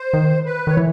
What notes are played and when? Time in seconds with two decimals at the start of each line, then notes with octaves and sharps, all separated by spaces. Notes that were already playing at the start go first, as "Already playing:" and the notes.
Already playing: C5
0.13 D#3
0.45 B4
0.67 D#3 C#5
0.77 E3